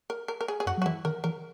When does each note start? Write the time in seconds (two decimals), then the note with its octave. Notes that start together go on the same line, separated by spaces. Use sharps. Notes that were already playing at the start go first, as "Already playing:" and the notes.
0.10 A#4
0.28 A#4
0.41 A#4
0.48 G#4
0.60 G#4
0.66 F#2 F#4
0.77 F#3
0.82 F#4
0.86 E3 E4
1.05 D#3 A#4
1.24 E3 A#4